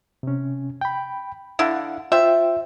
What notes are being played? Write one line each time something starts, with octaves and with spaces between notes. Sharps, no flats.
C3 C#4
G5 B5
D3 E4 F5 F#5
F4 C5 E5 G5